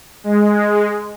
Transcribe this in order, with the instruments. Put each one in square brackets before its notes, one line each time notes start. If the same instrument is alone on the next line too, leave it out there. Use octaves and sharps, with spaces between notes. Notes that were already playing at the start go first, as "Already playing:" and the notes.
[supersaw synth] G#3